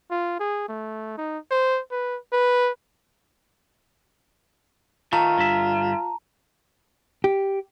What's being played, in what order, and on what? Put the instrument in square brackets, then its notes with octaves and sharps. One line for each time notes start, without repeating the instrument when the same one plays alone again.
[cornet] F4
G#4
A3
D#4
C5
B4
B4
[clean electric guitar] D#3 A3 [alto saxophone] F4 [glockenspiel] A5 A#5
[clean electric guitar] G2 D3 E5
[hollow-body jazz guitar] G4